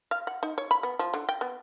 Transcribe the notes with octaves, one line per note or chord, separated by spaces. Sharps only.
F5
F#5
D#4
C#5
B5
B3
F3
D3
G5
B3